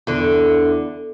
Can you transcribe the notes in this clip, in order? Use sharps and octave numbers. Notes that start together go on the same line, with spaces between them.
E2 D3